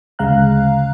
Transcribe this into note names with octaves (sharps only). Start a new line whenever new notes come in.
D2 C#3 G#3 F5 A#5 F#6